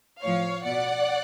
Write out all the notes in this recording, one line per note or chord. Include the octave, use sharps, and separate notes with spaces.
A2 F3 C#5 F5
B2 D5 F#5